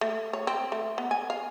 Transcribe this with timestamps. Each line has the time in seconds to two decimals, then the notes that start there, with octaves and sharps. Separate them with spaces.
0.01 A3
0.33 C#5
0.47 C4
0.72 A3
0.98 B3
1.11 G#5
1.30 F5